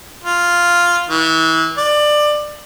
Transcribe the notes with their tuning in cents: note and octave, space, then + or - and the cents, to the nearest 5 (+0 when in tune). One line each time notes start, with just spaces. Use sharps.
F4 +0
E3 -30
D5 +20